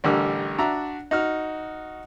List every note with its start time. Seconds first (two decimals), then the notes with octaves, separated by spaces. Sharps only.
0.04 A1 D3 G3 A#4 D6 E6
0.58 D4 F#4 E5 A#5
1.11 D#4 F#4 F6